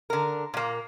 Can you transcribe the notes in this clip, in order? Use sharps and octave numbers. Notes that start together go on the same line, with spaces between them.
D3 A#4
A#2 A#3